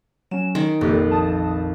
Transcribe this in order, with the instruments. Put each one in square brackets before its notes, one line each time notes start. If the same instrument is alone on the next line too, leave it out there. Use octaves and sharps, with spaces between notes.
[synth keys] F#3 C#4 [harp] E7
[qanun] D#3
[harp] A#1 F2 [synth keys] A#3 G4 A4
[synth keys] A5 D#6